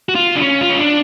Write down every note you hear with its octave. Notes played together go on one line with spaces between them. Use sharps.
F#4
F4
D4
C#4
F4
C#4
D4